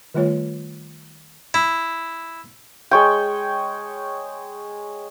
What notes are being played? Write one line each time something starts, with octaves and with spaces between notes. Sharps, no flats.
D#3 G3 A3 F4 C#5
E4
G#3 C#5 G5